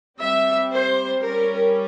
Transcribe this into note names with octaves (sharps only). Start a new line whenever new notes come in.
G3 C4 E5
C5
G3 C#4 A#4